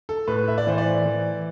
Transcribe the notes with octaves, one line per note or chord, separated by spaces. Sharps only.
A4
A2 B4
E5
D5
E3 C5
D5
E3